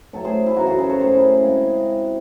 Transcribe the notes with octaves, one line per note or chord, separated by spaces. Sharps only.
A2 F#3 A3 A4 C#5
G#4 C5
E4 G#4
F#2 C#3 E3 D#4 F#4
F#4 A4
G#4 C5
A4 C#5
F#2 D#3 A3 G#4 C5
C#4 E4
C#3 G#3 C4